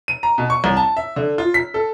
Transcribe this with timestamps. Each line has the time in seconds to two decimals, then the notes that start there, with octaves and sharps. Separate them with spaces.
0.08 D#7
0.23 A#5
0.38 B2
0.50 C#6
0.64 C2
0.77 A5
0.97 E5
1.16 D3
1.38 F4
1.54 B6
1.74 A4